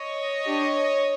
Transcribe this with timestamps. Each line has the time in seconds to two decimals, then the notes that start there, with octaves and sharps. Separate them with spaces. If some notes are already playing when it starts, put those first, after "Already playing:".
Already playing: C#5 D#5
0.44 D4 G4